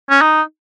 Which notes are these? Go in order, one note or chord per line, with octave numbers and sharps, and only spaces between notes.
C#4
D#4